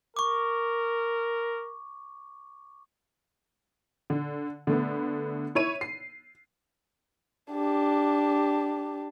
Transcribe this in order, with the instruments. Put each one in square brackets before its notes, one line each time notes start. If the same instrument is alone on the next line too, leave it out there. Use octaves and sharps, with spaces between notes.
[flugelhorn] A#4 [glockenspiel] C#6 D6
[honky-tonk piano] D3
D3 A3 B3
E4 C#5 D#7
C7
[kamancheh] D4 G4